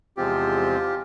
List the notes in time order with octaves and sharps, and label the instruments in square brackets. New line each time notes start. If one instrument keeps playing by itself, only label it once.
[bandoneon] E2 C3 F3 G#3 C4 F4 G4